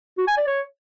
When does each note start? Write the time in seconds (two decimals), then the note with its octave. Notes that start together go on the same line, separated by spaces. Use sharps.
0.18 F#4
0.28 G#5
0.37 D5
0.47 C#5